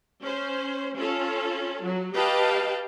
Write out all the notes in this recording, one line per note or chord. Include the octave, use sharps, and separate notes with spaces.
C#4 C5
C#4 F4 A4
F#3
G4 B4 D#5 F5 G5 A5